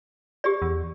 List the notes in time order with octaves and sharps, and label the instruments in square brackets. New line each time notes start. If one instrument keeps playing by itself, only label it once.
[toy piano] G4 G#4 D5
[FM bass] E2